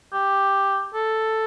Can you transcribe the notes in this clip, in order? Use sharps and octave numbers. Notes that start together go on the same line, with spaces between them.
G4
A4